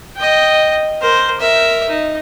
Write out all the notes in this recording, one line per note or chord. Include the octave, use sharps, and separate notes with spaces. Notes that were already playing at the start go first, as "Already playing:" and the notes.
D#5 G5
A#4 C5
A#4 E5
D#4